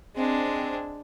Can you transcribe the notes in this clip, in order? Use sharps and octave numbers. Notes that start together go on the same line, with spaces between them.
G#3 C4 D4